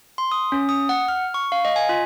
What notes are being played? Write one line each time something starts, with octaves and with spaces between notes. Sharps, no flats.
C6
D#6
C#4
D#6
F#5
F6
C#6
F5
D#5
G#5
F4